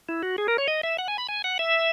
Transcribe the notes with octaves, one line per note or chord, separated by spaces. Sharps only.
E4
F#4
G#4
A#4
C#5
D#5
E5
F#5
G#5
B5
G#5
F#5
E5